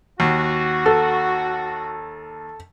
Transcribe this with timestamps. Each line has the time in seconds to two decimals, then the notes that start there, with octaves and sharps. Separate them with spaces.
0.20 D#2 F#4
0.86 A4